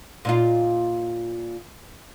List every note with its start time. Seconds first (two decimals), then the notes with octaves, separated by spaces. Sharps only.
0.25 A#2 D#4 F4